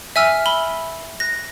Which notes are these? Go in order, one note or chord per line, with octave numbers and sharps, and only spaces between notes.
E5 G#5 E6 F6
B5 G7
F#6 A#6